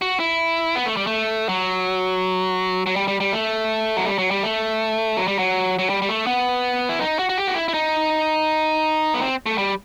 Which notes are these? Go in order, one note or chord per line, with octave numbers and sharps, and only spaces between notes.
F#4
E4
B3
A3
G3
A3
F#3
F#3
G3
G3
G3
A3
F#3
G3
F#3
G3
A3
F#3
G3
F#3
F#3
G3
G3
A3
B3
E4
D#4
F#4
F#4
G4
F#4
E4
E4
D#4
B3
C4
A3
G3